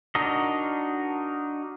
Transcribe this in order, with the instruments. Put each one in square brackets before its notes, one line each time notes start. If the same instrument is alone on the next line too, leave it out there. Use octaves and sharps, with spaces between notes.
[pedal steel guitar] D4 D#4 F#4 A#4 D#5